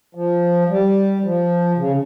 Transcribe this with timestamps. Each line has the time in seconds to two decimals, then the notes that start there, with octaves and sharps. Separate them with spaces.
0.15 F3
0.69 G3
1.24 F3
1.78 C#3